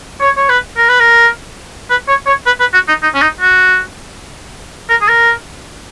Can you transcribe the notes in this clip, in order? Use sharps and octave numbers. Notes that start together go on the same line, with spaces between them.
C#5
C#5
B4
A#4
B4
A#4
B4
C#5
C#5
B4
B4
F#4
D#4
D#4
C#4
D#4
F#4
A#4
G#4
A#4